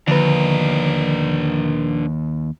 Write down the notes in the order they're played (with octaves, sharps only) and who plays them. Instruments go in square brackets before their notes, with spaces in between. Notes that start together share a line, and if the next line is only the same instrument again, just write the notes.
[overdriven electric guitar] D#2 [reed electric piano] D3 [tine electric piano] F3 B4 [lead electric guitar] D4 A#4